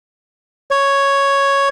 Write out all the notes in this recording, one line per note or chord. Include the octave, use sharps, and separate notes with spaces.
C#5